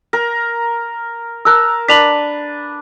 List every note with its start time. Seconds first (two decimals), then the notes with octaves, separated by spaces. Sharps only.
0.13 A#4
1.45 A#4 A5 E6 F#6
1.88 D4 B4 B6 F7 F#7